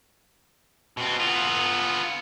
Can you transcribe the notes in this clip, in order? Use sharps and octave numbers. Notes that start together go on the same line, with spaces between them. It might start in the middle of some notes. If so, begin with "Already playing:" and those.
B2 C4
B3 F4